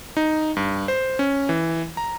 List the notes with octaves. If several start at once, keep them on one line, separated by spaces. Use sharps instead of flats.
D#4
G2
C5
C#4
E3
A#5